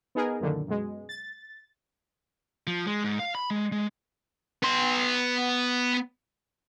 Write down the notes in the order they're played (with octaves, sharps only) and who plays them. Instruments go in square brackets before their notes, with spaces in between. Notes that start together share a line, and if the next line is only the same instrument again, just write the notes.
[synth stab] B3 D#4 G#4 A#4
F#2 A#2 D3 D#3
F#2 B2 G#3
A6
[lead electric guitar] F3
G#3
G#2
F5
B5
G#3
G#3
B3 C6